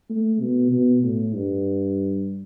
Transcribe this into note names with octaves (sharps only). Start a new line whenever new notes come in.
A3
B2
B2
A2
G2